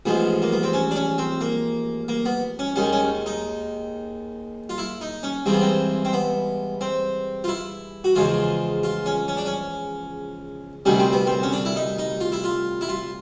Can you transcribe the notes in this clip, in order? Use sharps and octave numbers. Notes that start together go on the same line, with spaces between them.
A1 G#2 F3 G#3 B3
A#3
B3
C4
C#4
D4
C#4
C4
A#3
A#3
B3
C#4
D#2 D#3 G#3 C#4
C#4
D#4
F4
E4
D#4
C#4
G2 E3 G#3 C4
B3
C4
C4
B3
C4
F4
E4
F#4
E2 C#3 F3 G#3 F4
F4
C#4
C#4
D4
C#4
D2 C3 D#3 G3 C#4
C4
B3
C4
C#4
D4
E4
D#4
D#4
F4
E4
F4
E4
F4